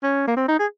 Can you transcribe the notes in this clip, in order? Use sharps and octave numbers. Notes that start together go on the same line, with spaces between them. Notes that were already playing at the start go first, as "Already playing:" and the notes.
C#4
A#3
C4
D#4
G#4